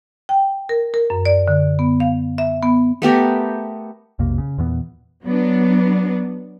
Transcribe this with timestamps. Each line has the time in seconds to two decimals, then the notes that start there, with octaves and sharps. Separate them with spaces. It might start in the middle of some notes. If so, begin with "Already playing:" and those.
0.29 G5
0.69 A#4
0.94 A#4
1.10 F#2
1.25 D5
1.48 D3
1.79 B3
2.00 F5
2.38 E5
2.62 B3
3.02 A3 B3 G4 A#4
4.19 B1 F2 C3 A#3
4.38 C#3
4.58 E2 A#2 E3 B3
5.24 F#3 B3 D4